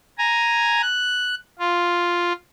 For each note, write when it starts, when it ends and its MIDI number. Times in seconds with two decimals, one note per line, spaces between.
0.18 0.82 80
0.18 0.82 82
0.82 1.35 90
1.59 2.32 65